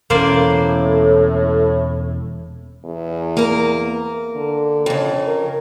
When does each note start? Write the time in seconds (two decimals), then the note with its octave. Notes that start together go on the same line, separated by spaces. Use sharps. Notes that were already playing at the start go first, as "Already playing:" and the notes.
0.10 E1 A2 A#3 C#4 C5 D5
2.85 E2
3.37 A#3 A#4
4.36 D3
4.86 F2 C#3
5.27 A#4